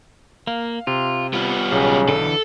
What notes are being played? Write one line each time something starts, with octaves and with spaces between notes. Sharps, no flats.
A#3 F5
C3 F4
G3 B3 F4
B1 C#3
D3 E3 A4